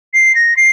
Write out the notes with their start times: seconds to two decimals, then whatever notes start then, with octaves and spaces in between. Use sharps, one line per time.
0.14 C7
0.35 A#6
0.57 C7